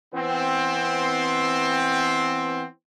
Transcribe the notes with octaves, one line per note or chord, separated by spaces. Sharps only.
E3 B3 C4